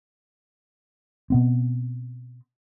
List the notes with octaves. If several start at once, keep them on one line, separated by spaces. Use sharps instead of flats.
B2 B3 C4